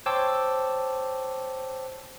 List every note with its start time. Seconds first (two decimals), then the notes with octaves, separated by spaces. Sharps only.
0.06 C5 C#5 G5 A5 D6 E6